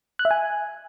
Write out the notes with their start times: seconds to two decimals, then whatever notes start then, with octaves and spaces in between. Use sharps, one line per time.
0.19 F#6
0.25 E5
0.31 G#5